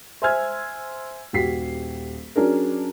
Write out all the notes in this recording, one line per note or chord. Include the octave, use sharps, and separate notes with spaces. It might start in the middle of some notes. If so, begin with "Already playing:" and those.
C5 E5 G#5 E6 F6 G#6
D#1 F#4 G4 B6 C7
F#3 C#4 D4 G#4 A#4